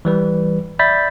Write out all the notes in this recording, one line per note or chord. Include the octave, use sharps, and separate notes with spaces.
E3 G3 B4
D5 E5 B5 G6 A6 B6